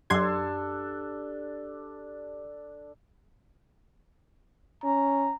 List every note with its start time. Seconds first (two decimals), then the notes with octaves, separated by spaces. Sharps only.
0.10 F#2 D4 G4 A4 C6 G#6
4.84 C#4 A#5